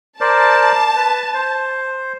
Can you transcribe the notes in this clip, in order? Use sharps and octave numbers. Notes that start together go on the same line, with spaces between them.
A#4 C5 D5 A5
B4
C5